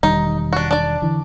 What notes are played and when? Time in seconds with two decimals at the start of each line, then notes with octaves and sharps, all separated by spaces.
0.03 E1 D#3 G3 D#4
0.53 D4 F#4
0.71 D4 D5
1.02 D3 E3